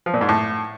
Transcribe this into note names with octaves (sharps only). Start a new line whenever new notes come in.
F3
A#2
G#2
A2